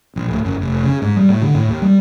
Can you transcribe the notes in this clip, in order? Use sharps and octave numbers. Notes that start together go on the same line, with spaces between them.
A#1
D1
F#1
F1
C#3
G#2
G3
A2
D3
A2
D#2
G3